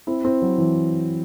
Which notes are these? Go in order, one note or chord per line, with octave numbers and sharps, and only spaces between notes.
C4 E4
C4 E4
F#3
E3